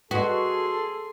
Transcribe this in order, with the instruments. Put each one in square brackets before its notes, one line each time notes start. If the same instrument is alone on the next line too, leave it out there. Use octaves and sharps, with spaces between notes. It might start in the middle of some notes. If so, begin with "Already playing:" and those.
[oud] F#4 [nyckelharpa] G#4 C6 [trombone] A4 [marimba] B4 D#5